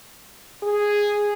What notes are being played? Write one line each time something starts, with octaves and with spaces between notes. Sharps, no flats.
G#4